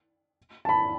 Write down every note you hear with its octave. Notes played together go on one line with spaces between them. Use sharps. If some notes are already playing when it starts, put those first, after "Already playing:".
A5
B5